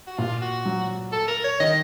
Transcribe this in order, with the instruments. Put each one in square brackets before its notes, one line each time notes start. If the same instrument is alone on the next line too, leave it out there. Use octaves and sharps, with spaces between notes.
[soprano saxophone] F#4
[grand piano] A#2 [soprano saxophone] F4
[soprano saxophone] F#4
[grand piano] F#3
[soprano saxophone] A4
A#4
C#5
[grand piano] D#3 [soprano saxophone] D#5